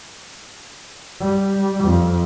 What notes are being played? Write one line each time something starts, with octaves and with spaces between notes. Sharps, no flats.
G3
F2